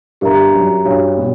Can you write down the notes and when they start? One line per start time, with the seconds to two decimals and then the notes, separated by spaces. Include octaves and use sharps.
0.21 G2 G4 A#4 E5 A#5
0.54 F#2
0.85 G2 D4 F#4 C#5
1.17 B2